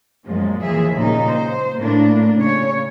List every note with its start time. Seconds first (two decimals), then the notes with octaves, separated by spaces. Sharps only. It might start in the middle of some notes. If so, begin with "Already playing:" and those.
0.25 F#2 A#2 F3 G#3
0.63 D#2 E3 F3 G#4 E5
0.96 A#2 C#3 D#4
1.29 C5
1.79 A2 A3 A#3 D4
2.40 C#3 C#5